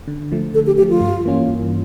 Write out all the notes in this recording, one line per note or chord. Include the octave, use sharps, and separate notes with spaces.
D3
F3 A3
D3 A4
G4
F3 A3 G4
F4
G2
E3 A#3 C#4 F4
G2